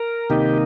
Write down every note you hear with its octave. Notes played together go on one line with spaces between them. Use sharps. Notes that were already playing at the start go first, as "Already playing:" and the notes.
Already playing: A#4
C3 D#3 A#3 D#4 G4